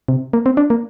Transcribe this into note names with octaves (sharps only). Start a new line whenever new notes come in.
C3
A#3
C4
D4
A#3